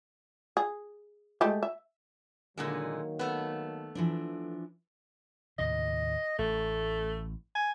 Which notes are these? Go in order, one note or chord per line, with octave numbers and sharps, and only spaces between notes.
G#4
G#3 A3 G4
E5
A#2 D3 D#3 F#3 G#3 A#3
A3 B3
E3 F3 D4
D#2 A2 C3 D#5
A1 A3
G#5